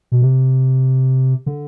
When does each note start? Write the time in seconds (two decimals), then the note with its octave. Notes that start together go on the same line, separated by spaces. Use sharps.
0.12 B2
0.22 C3
1.46 D3